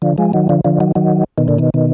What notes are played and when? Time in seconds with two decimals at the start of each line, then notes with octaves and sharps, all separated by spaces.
0.02 D3 F3
0.18 F3 G#3
0.33 D#3 F#3
0.49 D3 F3
0.65 D3 F3
0.80 D#3 F#3
0.95 D#3 F#3
1.38 B2 D#3
1.48 A#2 D3
1.58 B2 D#3
1.74 B2 D#3